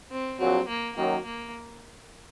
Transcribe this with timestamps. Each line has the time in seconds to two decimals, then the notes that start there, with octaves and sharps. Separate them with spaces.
0.11 C4
0.40 A#1 A#2 F#3 C4
0.69 A#3
0.97 F#2 D#3 F#3 A#3
1.25 A#3